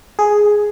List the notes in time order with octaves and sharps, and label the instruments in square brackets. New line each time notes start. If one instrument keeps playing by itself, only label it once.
[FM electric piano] G#4